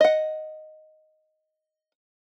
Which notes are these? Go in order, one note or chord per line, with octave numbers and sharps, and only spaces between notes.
D#5 F#5